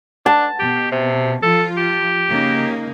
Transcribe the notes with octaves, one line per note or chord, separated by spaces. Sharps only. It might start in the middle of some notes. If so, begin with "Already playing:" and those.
D4 A5
B2 G4
C3
F3 F4 A4
G4
C#3 A#3 D#4